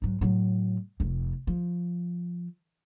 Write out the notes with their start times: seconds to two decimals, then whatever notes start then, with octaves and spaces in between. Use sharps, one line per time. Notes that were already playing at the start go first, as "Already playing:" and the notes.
0.02 G#2 F#3
0.21 A2 F#3
1.00 F1 F2
1.47 F3